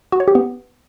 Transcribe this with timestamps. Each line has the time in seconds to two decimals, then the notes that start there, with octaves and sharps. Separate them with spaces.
0.12 F#4
0.20 C#5
0.28 G4
0.35 B3